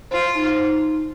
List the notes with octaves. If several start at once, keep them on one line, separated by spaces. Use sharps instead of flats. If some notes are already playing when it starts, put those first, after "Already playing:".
F4 C5
D#4
D#4